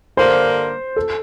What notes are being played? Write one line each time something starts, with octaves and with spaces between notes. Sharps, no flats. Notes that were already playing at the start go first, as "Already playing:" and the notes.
G2 D3 G3 A#3 C5
A4